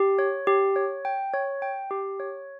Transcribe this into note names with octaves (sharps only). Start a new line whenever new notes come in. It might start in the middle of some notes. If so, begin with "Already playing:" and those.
Already playing: G4
C#5
G4
C#5
G5
C#5
G5
G4
C#5